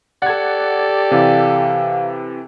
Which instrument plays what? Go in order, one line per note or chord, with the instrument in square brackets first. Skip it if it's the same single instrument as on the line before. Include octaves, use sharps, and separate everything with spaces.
[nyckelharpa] G4 A4 [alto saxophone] D5 [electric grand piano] F#5 G#6
[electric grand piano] C3 E3 [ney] F5